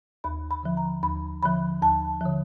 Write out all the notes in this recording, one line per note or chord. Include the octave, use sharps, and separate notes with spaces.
D#2 B5
B5
D3 F3
A#5
D#2 B5
D3 F3 B5
D#2 A5
D3 F3